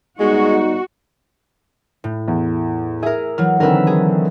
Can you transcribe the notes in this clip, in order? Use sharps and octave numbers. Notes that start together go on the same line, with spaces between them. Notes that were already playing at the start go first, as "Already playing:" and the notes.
G3 G#3 B3 D#4 F#4
A2
E2
G#4 A#4 E5
E3 F#3 F6
D3 D#3 C4 A#4 B4 E5
G#4